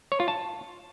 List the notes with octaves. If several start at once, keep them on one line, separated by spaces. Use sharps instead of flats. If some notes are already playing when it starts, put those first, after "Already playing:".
C#5
F4
A5